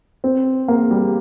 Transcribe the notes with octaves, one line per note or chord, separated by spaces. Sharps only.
C4
A#3
G3